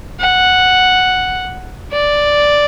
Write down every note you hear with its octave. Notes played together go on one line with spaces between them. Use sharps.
F#5
D5